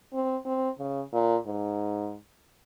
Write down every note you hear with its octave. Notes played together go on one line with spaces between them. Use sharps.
C4
C4
C#3
A#2
G#2